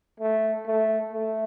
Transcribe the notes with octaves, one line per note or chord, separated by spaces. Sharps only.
A3
A3
A3